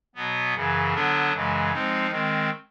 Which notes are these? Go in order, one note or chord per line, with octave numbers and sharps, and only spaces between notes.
B2 F#3 B3
F#2 C#3 E3
D3 F#3 B3 D4
F#2 C#3 E3 G#3
F3 G#3 C4 D#4
D#3 G#3 C4